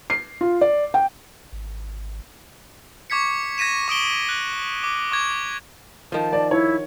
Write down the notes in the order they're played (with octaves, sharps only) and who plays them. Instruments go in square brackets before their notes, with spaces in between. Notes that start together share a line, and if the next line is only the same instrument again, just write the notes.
[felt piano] C7
F4
D5
G5
[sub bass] G#1
[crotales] C#6 D6 G#6 B6 C#7
G#6 A#6 B6 D#7 E7
C#6 D#6 D7 G7
F#6
D6
C#6 D6 G#6
[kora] D#3 F3 [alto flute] A5
[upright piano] D5
[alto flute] E4 [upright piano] C#5